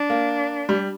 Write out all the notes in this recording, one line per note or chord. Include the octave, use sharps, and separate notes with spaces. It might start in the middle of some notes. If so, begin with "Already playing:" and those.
Already playing: D4
A#3
G3